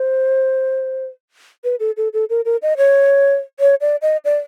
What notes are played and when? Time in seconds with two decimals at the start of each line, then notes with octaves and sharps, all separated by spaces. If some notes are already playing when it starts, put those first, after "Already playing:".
Already playing: C5
1.64 B4
1.80 A4
1.97 A4
2.13 A4
2.30 A#4
2.45 A#4
2.62 D#5
2.77 C#5
3.60 C#5
3.81 D5
4.02 D#5
4.25 D5